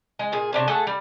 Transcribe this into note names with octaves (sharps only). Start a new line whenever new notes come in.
G#3
A#2 G#4
C3 D4 C#5
A3 G#4 A4 F#5
G3